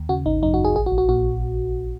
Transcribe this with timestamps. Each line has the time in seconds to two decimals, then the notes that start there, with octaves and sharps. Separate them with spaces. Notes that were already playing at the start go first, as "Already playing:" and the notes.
Already playing: D#2
0.09 C#3 F#4
0.26 G#1 D#4
0.42 F#2 D#4
0.54 F#4
0.59 G#1
0.65 G#4
0.75 A#1 G#4
0.86 F#4
0.92 A#1
0.98 F#4
1.09 A#2 F#4